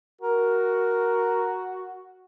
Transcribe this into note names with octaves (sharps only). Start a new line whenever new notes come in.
F#4 A#4